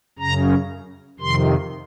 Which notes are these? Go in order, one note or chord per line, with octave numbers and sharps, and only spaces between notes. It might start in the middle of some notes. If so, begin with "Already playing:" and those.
F#2 C#3 A#5
F2 C3 D#3 C6